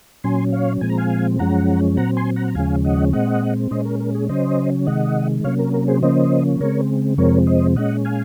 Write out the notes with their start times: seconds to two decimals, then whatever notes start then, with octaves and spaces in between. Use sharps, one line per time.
0.24 A#2 F#3 C#4 G#5 C6
0.52 C#5 F5
0.81 A#2 F3 G#3 C4 G#5
0.90 A#5
0.98 F5 G#5
1.39 F#2 F3 G#3 C#4 F#5 A#5
1.97 A#2 F#3 C4 F#5 A#5
2.17 G#5 C6
2.36 F#5 A#5
2.48 A#5
2.55 D#2 C#3 F3 G#3 C#4 F5 G#5
2.84 D#5 F#5
3.13 A#2 G#3 C4 D#5 F#5
3.71 A#2 G#3 C#4 C5 D#5
3.85 A#4
4.00 A#4
4.15 G#4
4.29 C#3 F#3 C#4 C5 D#5
4.87 C3 D#3 G#3 D#5 F#5
5.44 C3 F#3 A#3 C#4 C#5 F5
5.59 A#4
5.74 A#4
5.88 G#4 C5
6.03 C#3 F3 A#3 C#4 C5 D#5
6.60 C#3 G#3 C4 A#4 C#5
7.18 F2 C3 F3 G#3 C4 A#4 C#5
7.47 C5 D#5
7.76 A#2 G#3 C#4 D#5 F#5
8.05 F5 G#5